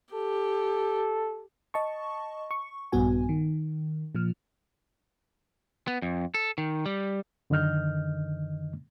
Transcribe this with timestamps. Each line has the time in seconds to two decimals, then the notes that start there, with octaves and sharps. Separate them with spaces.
0.14 G4 A4
1.74 D#5 A5 C#6
2.51 C#6
2.92 A#1 G2 B3 F#4 G#5
3.29 D#3
4.15 A#2 F3 F6
5.88 B3
6.02 F2
6.34 A4
6.58 D#3
6.86 G3
7.50 F#2 D3 D#3 D#5 F6 G6